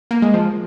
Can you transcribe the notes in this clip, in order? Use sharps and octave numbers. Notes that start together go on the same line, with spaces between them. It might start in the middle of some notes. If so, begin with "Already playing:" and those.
A#3
G#3
F3